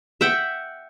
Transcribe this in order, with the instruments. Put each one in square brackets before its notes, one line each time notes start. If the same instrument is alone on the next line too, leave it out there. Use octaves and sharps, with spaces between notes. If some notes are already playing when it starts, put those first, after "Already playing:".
[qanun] E5 F#5 G5